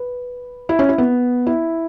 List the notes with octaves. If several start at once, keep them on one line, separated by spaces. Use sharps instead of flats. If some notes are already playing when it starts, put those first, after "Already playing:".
Already playing: B4
E4
C#4
E4
B3
E4